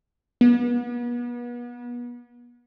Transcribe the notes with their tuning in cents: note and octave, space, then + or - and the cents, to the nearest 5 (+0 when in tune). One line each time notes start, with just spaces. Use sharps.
B3 -35